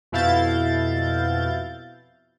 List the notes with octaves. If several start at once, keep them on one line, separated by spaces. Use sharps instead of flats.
F2 B2 E4 F5 G6 A6